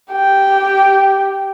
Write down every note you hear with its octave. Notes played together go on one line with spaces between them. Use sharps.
G4 G5